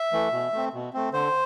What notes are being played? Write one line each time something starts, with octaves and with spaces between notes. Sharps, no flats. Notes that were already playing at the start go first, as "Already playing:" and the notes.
Already playing: E5
E3 A3
B2
A3 C4
B2
A3 C4
D3 C5